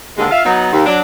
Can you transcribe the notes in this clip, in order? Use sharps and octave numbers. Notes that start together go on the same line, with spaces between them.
D#2 D3 G#3
F4 E5 F5
F#3 B3 D#4
D#2
F#3 D4